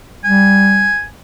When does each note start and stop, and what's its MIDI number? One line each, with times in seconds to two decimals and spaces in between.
0.24 0.91 55
0.24 1.03 80